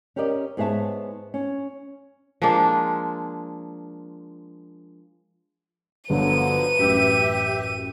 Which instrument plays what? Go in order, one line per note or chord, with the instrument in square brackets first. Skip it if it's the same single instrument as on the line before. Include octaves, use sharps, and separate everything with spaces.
[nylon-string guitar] C#4 G4 A#4 D5 D#5
G#2 B3 G#4 C#5 E5 A5
C#4
[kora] F3 G#3 A#3 D4
[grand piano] G1 [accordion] D3 F3 F#3 [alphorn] B4 [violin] D#7
[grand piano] A1 F#2 [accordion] G4 E5